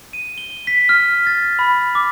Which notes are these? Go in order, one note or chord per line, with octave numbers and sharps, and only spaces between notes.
D#7
G7
B6
F6
A6
B5
D6